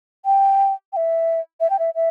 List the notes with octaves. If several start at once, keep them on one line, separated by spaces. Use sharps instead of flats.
G5
G5
E5
E5
G5
E5
E5